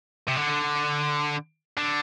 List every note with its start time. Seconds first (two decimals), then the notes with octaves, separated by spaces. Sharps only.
0.28 C3
0.36 D3
1.77 D3